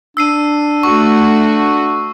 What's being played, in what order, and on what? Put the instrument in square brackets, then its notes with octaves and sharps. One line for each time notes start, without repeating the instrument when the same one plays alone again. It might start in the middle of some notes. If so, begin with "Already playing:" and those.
[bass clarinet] D4 [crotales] E6 C7 D#7
[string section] A3 F#4 [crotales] C#6